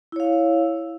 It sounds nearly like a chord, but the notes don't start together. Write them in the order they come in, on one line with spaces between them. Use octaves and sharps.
E4 C#5 F5